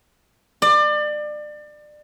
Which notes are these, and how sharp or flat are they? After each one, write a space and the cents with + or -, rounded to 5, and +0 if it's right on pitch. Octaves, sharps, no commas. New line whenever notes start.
D5 +30